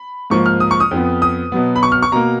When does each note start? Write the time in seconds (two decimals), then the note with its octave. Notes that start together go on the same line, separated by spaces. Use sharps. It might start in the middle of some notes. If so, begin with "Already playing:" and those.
Already playing: B5
0.30 G#2 F3 A#3 C#6
0.46 F6
0.60 D#6
0.71 C#6
0.80 D#6
0.91 F2 F3 B3
1.22 D#6
1.52 B2 F#3 B3
1.76 B5
1.83 C#6
1.92 F6
2.02 C#6
2.12 B2 A#3 A#5